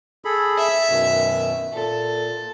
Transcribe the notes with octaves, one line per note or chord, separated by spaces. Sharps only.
G#4 A4 B5
E5
F#2 B2 D#3
A#2 A4